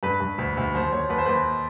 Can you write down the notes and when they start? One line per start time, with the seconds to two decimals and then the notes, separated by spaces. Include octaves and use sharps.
0.03 G2 B4
0.20 G2
0.38 D2
0.57 D2
0.74 D#2 C5
0.91 D#2 C#5
1.09 D#2 B4
1.18 C5
1.26 D#2 B4